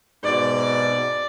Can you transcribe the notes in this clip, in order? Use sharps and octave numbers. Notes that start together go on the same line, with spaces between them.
G#2 B2 D5